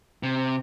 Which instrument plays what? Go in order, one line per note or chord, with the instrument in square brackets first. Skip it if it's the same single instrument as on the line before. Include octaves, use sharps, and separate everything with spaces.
[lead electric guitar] C3